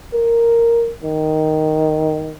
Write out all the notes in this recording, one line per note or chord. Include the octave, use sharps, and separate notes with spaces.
A#4
D#3